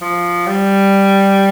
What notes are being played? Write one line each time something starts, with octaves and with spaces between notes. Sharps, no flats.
F3
G3